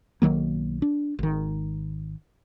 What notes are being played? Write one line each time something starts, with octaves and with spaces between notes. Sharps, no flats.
B1 D#3 F#3 A#3
D4
G#1 D#3